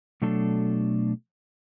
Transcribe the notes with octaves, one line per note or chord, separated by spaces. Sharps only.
B2 F#3 A3 D4 A4